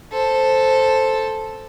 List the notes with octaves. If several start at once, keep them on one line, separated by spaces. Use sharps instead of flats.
A4 C5